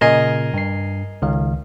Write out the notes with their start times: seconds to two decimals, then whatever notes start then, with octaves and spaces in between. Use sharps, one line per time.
0.01 A#2 C#3 A#4 D#5 G#5 C7
0.54 G2 C7
1.22 C#2 D#3 F5